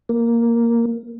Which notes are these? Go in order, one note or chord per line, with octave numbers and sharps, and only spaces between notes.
A#3